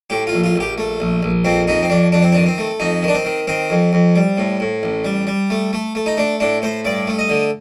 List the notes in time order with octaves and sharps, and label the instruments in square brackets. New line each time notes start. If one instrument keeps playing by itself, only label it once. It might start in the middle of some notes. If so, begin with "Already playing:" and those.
[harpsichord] A2 G4
F4
A#1
F4
A#1 G4
A3
A#1
A#1
F2 C4
F2 D#4
C4
F2 D4
F2 D4
C4
D#3 D4
C4
A3
F2 D#4
D#3
D4
C4
D#3
D#3 C4
F2
F2
G3
A2
A2
A1
G3
G3
A3
A3
A3
D#4
A3 D4
A2 D4
A2 C5
G2 D5
A3
D#5
D3